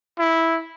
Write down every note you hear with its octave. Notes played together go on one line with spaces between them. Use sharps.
E4